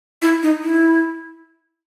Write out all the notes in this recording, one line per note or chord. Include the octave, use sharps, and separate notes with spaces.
E4
D#4
E4